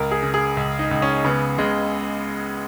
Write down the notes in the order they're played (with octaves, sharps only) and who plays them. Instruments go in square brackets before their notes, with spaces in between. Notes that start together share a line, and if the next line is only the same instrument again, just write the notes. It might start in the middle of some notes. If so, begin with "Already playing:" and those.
Already playing: [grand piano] C#2 A#4
G#4
C#3
G#4
C#2
D#4
C#2
C#4
C#3 B3
C#3 G#3